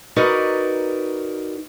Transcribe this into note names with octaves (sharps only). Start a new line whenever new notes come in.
D#4 F#4 A#4 B4 D5 D#5